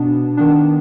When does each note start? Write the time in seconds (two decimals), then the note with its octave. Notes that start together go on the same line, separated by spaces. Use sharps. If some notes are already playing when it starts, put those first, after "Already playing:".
Already playing: B2 B3 D4
0.37 D#3 B3 D4